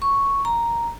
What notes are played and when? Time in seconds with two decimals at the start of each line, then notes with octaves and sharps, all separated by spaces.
0.02 C#6
0.45 A#5